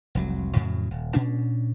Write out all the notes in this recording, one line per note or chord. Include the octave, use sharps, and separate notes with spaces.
F1 C2 F#3
F2 A2 C#3 F#3
D#1
A#2 C#4 D4